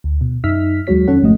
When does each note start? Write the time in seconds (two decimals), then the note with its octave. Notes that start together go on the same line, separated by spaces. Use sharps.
0.04 D2
0.21 B2
0.44 F#2 D#4 E5 E6 F6 B6
0.87 D#2 F#3 G#3 F#4 C#5 B6
1.08 F2 D#3 C#4 A4 C#5 F#5
1.22 G#1 G#2 F3 A3 F#4 D#5